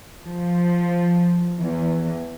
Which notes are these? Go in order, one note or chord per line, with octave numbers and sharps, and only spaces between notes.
F3
E2